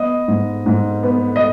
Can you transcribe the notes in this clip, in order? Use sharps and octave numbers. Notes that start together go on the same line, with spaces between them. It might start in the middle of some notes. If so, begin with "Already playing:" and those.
Already playing: B3 D#5
G#2
G#2
B3
D#5